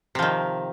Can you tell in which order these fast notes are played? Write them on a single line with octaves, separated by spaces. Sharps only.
C3 F3 D#3